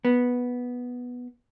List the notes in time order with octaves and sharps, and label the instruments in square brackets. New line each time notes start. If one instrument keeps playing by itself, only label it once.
[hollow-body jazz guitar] B3